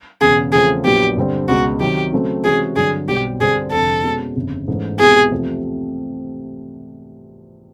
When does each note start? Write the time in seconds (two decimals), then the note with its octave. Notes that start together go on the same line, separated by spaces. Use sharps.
0.21 E1 E2 C#3 G#4
0.52 E2 C#3 F3 A3 C4 G#4
0.85 A#1 A#2 F#3 B3 G4
1.17 G2 D3 G3 C4
1.48 C#2 B2 G#3 F#4
1.80 C3 D#3 F#3 G4
2.12 C#3 F#3 A3 C4
2.44 C3 E3 G#3 C#4 F#4 G#4
2.76 G2 D3 F#3 G#4
3.08 B1 B2 G3 C4 G4
3.40 G2 D3 G3 C4 G#4
3.72 F1 F2 D3 A4
4.04 B2 G#3 C#4
4.36 G1 F2 C#3
4.68 G#2 E3 A3 C#4
4.99 C2 B2 G#3 B3 E4 G#4
5.31 E2 C3 F3 A3 C4